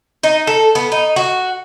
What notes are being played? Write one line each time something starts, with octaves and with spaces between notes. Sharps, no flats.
D#4
A4
B3
D#4
F#4